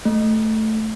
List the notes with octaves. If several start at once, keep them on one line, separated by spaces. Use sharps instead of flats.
A3